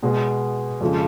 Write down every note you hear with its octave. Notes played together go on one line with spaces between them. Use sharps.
B2 G#3 B3
F2 C#3 F3 G#3